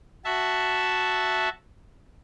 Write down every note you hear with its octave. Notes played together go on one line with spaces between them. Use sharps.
F#4 E5 A5